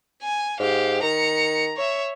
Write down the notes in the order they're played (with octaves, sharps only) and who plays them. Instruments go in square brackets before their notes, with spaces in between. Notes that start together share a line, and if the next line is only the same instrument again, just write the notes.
[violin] G#5
[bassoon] G#2 [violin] G4 F5
[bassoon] D#3 [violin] A#5 C#7
[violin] C#5 E5